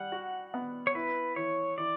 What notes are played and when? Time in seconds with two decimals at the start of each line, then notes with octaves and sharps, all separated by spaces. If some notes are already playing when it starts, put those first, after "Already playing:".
Already playing: G3 F#5
0.12 F#4
0.54 B3
0.87 C#5
0.95 E4 B4
1.36 E3 C#5
1.78 E3 D5